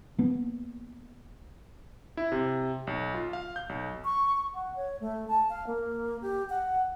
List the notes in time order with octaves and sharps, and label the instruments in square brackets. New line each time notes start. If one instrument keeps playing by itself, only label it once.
[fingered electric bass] A#3 B3
[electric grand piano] E4
C3
B1
F4
F5
G6
B1
[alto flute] C#6
F#5
C#5
A3
A5
F5
A#3
G4
F#5